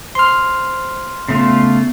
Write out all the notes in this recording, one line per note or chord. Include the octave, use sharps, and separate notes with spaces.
C5 C6 F6
C#3 A3 B3 F4